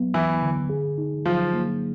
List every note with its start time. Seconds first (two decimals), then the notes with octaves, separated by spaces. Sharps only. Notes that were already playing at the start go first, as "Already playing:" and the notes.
Already playing: F#3 B3
0.14 D2 E3 E4
0.42 D3
0.70 G#4
0.98 D#4
1.25 F3 F#3 F4
1.53 A#3